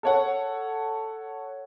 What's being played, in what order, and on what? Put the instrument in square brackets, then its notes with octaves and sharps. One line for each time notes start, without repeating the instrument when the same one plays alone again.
[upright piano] A4 C#5 F#5